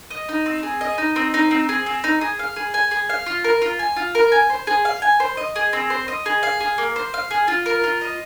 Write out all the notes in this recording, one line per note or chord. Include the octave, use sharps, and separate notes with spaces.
D#5
D#4
C4
G#4
D#5
D#4
C4
D#4
C4
G#4
C4
D#4
G#4
F5
G#4
G#5
G#4
F5
F4
A#4
F4
G#5
F4
A#4
G#5
C5
G#4
F5
G#5
C5
D#5
G#4
C4
C5
D#5
G#4
F5
G#4
A#3
C5
F5
G#4
F4
A#4
F4
D#5